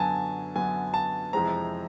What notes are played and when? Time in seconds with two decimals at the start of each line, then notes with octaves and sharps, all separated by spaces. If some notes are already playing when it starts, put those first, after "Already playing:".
Already playing: F#2 D3 F#3 B3 G#5 A5
0.56 F#2 D3 F#3 B3 G#5
0.94 A5
1.33 F2 C3 E3 G#3 C4 A#5